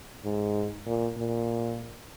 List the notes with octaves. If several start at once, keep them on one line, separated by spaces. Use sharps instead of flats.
G#2
A#2
A#2